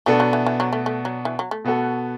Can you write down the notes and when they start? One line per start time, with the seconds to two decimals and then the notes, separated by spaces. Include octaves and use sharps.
0.06 B2 A3 B3 D4 A4
0.20 F#3
0.33 E3
0.46 E3
0.60 F#3
0.73 A3
0.86 A3
1.05 F#3
1.25 E3
1.39 F#3
1.51 A3
1.64 B2 B3 F#4 A4